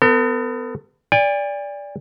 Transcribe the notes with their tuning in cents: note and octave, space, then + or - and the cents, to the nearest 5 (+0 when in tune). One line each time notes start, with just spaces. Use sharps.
B3 +25 A4 +45
D5 -15 G#5 -45